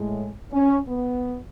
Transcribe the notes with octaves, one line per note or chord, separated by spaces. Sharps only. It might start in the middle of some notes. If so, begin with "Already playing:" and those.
Already playing: A2 G#3
C#4
B3